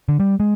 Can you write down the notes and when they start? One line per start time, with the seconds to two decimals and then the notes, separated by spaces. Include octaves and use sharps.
0.09 D3
0.20 G3
0.40 G#3